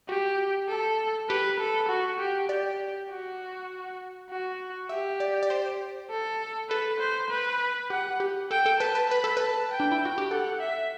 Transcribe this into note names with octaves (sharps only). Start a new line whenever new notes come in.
F#4 G4
A4
G4 B4
A4
F#4
G4
G4 D5
F#4
F#4
G4 E5
D5
D5
C5
A4
A4 B4
C5
B4
G4 F#5
G4
A4 G5
A4
B4 A5
B4
B4 B5
A4
B4 A5
G5
D4
E4
F#4
G4
A4 F#5
E5